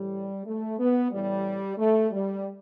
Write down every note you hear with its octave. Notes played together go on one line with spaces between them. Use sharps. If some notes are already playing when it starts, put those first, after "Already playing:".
Already playing: A2 E3 G3
A3
B3
A2 E3 G3
A3
G3